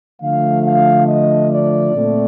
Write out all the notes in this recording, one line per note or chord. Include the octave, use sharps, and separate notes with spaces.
D3 F3 A3 F5
F5
D#5
D5
A#2 A3 C4